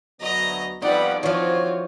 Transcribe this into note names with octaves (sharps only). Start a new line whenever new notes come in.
D2 F#3 B3 D#5 A#5
F2 G3 B3 D#4 B4 D5 F#5
E3 F3 C4 F4 F#4 C#5